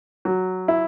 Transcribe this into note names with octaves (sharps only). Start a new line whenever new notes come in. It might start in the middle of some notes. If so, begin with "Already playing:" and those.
F#3
E4